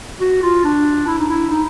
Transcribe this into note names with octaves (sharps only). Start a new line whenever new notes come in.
F#4
F4
D4
E4
D#4
E4
D#4